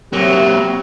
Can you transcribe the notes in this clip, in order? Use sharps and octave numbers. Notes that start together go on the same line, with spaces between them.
C3 F#3 A#3 C4 G4